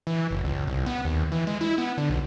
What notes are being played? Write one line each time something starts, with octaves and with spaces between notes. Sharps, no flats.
E3
F#1
C#2
C2
B3
D#2
E3
G#3
E4
B3
D3
B1